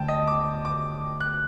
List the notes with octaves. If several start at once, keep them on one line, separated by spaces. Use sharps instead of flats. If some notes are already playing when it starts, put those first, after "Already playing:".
Already playing: D3 A3 D4 G5 A5
D#5
D6
D6
F#6